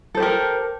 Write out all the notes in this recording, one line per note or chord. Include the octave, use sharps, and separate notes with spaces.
G4 A4 A#4 C5